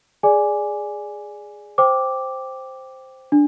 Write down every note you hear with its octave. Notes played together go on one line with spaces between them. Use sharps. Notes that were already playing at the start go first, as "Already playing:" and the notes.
G#4 D5 G#5 D6
C5 G5 D6
D4